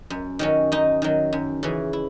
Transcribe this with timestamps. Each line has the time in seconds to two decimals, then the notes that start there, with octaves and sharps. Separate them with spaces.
0.10 F#2
0.39 D#3 F#3 C#4
0.72 F#2 D#4
1.02 D#3 F#3
1.33 F#2
1.63 C#3 E3
1.93 E4